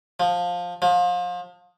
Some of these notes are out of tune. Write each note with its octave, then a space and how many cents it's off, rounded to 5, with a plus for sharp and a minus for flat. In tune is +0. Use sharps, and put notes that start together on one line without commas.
F3 +15
F3 +30